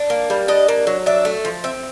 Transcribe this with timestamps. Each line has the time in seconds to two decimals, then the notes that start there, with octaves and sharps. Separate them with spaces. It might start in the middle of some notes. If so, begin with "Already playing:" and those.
Already playing: D4
0.10 A#3
0.30 G3
0.48 D4 D#5
0.68 A#3
0.87 F#3
1.06 D4 E5
1.25 A3
1.45 F3
1.64 C4 E5